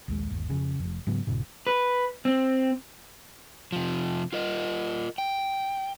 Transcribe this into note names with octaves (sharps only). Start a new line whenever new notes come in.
A#1 D#2 G#3
G1 D#2
F2 C#3
F1 F2
G#2 C#3 F#3 B3
A#1 G2 A#2 C#3
B4
C4
C3 F3
F4 A#4 D#5
G5